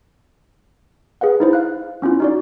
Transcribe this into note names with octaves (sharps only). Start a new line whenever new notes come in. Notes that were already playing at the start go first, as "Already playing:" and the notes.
G#4 B4 F5 F#5
D#4 E4 C5
F5 F#6
B3 C#4 E4 F4
D#4 F#4 D5